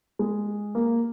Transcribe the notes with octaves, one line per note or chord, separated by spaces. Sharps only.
G#3
A#3